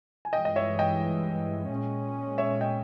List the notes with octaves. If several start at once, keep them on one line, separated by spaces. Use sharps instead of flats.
G#5
G2 E3 G#3 D#5 G5
D#5
C#5 E5
D#5 G5
A#2 G#3 C#4
C#5 E5
D#5 G5